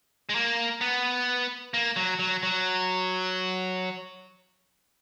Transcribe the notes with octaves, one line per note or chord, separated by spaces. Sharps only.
G#3
A#3
B3
A#3
F#3
F#3
F#3